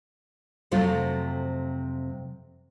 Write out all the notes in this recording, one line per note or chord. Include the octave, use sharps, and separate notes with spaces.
F2 C3 F#3 A3 F4